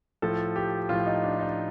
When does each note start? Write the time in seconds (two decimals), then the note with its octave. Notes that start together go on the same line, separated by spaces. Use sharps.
0.22 A2 F3 A4
0.56 G4
0.89 A2 F4
0.92 F3
1.06 D#4
1.23 D4
1.39 D#4